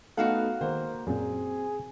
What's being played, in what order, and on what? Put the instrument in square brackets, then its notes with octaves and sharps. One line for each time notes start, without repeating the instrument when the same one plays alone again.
[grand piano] A3 B3 D#4 [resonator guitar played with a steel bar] F#4 F5 F#5 [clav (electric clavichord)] A4
[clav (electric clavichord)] D#3 G#3 [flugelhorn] A#3 [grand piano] C5
[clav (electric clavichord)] F#2 A#2 [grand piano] C4 [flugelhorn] G#4